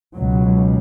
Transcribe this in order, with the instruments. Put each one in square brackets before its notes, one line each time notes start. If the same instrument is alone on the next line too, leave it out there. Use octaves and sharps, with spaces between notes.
[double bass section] C#2 B2 F#3